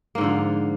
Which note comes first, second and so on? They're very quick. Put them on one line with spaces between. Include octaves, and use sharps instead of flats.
A#3 G#2 D3 F3